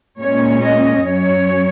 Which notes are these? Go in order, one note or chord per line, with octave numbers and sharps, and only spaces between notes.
A#2 G#3 C#4 C#5
D#5
F#2 F#3 C#4 C#5